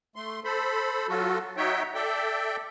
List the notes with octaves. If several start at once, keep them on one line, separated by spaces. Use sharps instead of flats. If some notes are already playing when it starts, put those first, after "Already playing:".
A3 C6
A4 C5 B5
F#3 F4 F#4 A4
D#4 F#4 C#5 E5 G5
A4 D5 E5 G5